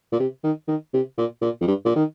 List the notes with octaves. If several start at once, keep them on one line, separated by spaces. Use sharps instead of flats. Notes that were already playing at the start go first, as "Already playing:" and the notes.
A#2
C3
D#3
D#3
C3
A#2
A#2
F2
G2
A#2
D#3